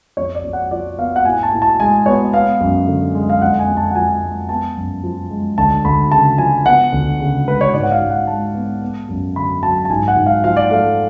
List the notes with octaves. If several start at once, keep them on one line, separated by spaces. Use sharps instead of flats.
F2 C#5
D5
F2
F#5
F3 D5
B3 F5
F#5
A2 G#5
A5
A2
A5
G#3 G#5
B3 C#5
B3 F5
F#2
D3
G#3
F5
F2 F#5
G#5
F2
A5
F#5
F3 G#5
G#3
B3 A5
F#2
F3
G#3
D2 A5
D2 B5
C#3 A5
F3 G#5
B3 F#5
D2
C#3
G#3 B4
C#5
G#2 D5
F#5
F5
G#2
F#5
G#3 A5
B3
B3
F#2
D3 B5
F#3 A5
A5
G#2 G#5
F#5
G#2
F5
F3 F5
D5
A3 F5